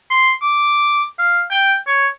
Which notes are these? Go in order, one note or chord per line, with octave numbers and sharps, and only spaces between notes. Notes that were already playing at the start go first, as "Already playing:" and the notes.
C6
D6
F5
G5
C#5